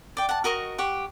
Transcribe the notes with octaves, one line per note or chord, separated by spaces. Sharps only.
D5 G5
F#5 A5
F#4 A#4 D#5 C#6
G4 F#5 C#6